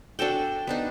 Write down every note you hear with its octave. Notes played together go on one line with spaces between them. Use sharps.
D4 F#4 A4 G5
B3 D4 D#4